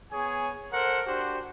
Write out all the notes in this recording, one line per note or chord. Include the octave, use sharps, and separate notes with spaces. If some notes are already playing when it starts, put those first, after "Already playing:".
B3 G#4 C#5 G#5
A4 A#4 C5 F#5
D4 F#4 G4 C5